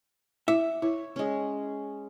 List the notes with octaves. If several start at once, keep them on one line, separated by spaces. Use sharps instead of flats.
E4 E5
E4 C#5
G#3 C#4